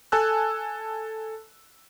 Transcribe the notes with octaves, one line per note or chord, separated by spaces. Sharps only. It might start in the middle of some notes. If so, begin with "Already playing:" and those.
A4 G#5 A5 E6 F#6